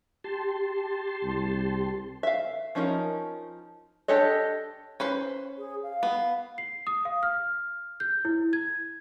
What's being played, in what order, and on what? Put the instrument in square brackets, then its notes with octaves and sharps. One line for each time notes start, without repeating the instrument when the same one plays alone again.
[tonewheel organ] G4 A5 C6
[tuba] C2
[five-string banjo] E5 F5
F3 C#4 D#4 G#4 A#4
D4 G4 A4 C#5 D#5
C#4 B4 C5
[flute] G#4
F5
[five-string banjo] B3
[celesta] C7
D#6
F5
F6
G6
E4
G#6